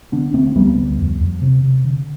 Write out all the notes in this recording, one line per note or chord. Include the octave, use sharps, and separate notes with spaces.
D3 B3 D4
D3 A3 C4
D2 G3 B3
D2
F2
F2
C3
C3
D3